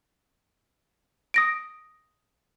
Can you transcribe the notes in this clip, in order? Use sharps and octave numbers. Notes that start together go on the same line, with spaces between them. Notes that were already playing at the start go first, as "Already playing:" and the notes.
D#6 A#6 D7